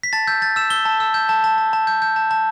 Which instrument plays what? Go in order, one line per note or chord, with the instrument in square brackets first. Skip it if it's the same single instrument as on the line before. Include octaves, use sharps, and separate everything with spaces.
[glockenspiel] B6
A5 A6
E6 G6
G6 A6
E6 E7
E6 G7
A5
E6
G6
A5
A5
A5
A5
G6
G6
A5
A5